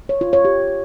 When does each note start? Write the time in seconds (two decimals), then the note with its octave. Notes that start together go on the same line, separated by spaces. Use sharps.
0.09 C#5
0.21 F4
0.33 C#5
0.45 G4